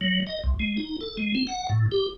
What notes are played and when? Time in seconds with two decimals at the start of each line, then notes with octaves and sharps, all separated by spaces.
0.01 F#3
0.27 D#5
0.44 C2
0.60 G#3
0.77 D#4
1.01 A4
1.17 G#3
1.35 C4
1.47 F#5
1.69 A2
1.92 G4